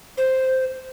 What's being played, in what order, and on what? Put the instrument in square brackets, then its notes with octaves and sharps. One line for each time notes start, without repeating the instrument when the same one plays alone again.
[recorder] C5